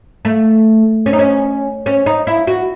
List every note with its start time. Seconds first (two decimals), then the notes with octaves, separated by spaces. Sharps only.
0.25 A3
1.06 C#4
1.13 D#4
1.19 C#4
1.86 C#4
2.06 D#4
2.27 E4
2.47 F#4